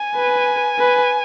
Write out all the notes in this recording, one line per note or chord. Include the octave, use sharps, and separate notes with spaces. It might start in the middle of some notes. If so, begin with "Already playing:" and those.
Already playing: G#5
B4
B4